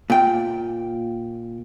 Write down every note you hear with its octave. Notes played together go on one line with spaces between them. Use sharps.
A#2 G5